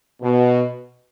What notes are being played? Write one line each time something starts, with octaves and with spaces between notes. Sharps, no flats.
B2